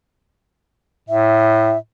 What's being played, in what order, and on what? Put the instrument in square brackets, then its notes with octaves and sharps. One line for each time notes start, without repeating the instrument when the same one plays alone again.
[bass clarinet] A2 [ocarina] E5